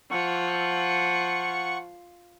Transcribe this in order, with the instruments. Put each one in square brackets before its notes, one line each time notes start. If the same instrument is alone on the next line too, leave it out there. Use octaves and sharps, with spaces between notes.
[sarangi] F3 [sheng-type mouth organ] F#5 C#6